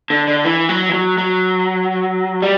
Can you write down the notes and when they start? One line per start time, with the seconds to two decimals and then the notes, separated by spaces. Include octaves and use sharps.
0.10 D3
0.27 D3
0.44 E3
0.69 F#3
0.89 E3
0.93 F#3
1.18 F#3
2.42 G3